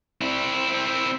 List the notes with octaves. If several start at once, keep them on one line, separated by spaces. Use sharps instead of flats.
C4 E4